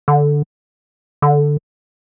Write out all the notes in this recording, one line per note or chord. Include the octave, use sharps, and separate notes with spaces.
D3
D3